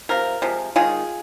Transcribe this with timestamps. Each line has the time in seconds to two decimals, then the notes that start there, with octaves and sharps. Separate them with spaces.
0.09 C3 F3 A#4
0.42 C3 F3 G#3
0.76 D#3 G#3 F4 G#4